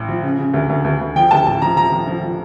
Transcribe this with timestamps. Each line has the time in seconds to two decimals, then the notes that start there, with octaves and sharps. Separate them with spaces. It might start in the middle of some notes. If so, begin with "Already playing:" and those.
Already playing: A1
0.09 F3
0.23 C#3
0.39 C#3
0.54 D2
0.69 D2
0.85 D2
1.01 D2
1.16 F3 G5
1.31 D2 A5
1.47 A1 A5
1.62 F3 A#5
1.77 F3 A#5
1.92 F3
2.07 F3
2.24 F3